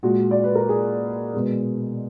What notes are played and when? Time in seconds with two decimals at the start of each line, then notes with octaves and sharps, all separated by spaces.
0.03 A#2 G#3 F#4
0.31 D5
0.44 B4
0.55 A#4
0.69 G#4
1.34 B2 G#3